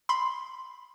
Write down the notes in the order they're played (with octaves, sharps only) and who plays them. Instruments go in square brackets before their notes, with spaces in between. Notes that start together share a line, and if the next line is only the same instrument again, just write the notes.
[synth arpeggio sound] B5 C6